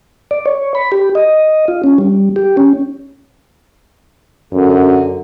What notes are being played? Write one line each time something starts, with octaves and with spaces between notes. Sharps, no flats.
D5
C#5
B5
G4
D#5
F4
C#4
G3
G4
C#4
F#2 D3